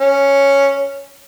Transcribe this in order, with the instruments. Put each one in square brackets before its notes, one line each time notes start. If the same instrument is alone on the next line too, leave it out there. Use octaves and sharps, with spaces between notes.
[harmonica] C#4